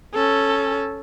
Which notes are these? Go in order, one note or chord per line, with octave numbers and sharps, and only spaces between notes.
C#4 A4